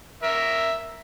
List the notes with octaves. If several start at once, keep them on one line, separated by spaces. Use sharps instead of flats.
A#4 E5